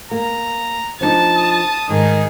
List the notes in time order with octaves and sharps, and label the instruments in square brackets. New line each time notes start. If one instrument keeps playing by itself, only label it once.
[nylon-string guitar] A#3 [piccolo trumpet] A#5
[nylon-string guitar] F3 D4 D#4 [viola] A5
[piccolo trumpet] D#6
[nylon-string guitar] G#2 [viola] D#3 [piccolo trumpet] G#4